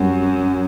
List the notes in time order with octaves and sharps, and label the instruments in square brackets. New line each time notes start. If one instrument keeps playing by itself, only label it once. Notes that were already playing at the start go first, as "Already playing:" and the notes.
Already playing: [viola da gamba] F#2 [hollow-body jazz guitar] G3 C4